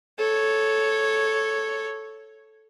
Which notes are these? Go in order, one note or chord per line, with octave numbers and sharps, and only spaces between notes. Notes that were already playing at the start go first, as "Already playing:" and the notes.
A4 C#5